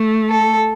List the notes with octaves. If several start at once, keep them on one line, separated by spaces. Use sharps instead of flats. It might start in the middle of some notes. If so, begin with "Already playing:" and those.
Already playing: A3
A4